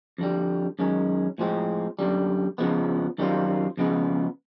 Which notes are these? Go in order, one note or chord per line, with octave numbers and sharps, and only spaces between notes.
F2 D3 G3
F#2 D#3 G#3 C#4
A2 F3 G#3 C4
F#2 D3 G3
F2 C#3 F3 G#3 B3
F#2 D#3 G3 C4 F4
F2 C#3 F3 G#3 B3